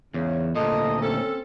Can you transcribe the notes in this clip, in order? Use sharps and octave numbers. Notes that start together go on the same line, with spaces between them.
E2 G#2 C#3
D2 A#2 A4 D#5
C4 C#4 A4